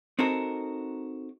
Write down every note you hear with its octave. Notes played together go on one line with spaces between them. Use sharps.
C4 D#4 F#4 A4 A#4